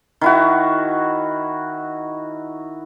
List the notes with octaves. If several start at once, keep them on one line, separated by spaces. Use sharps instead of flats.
D#3 E4 F#4